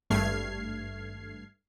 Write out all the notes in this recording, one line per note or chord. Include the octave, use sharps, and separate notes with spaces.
G#1 G2 A3 F6 G#6 C7